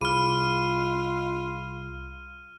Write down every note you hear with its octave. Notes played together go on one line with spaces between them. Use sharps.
C2 F4 G#4 B5 F6 D#7